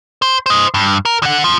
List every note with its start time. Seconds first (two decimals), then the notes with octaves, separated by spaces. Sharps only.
0.22 C5
0.46 C5 D#5
0.74 G2
1.05 A#4
1.23 D3 F#5
1.44 F2 F3